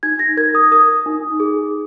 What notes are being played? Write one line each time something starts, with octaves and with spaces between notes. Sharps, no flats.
D#4 G#6
A#6
A#4 G#6
D#6
A#4 D#6
D#4
G#4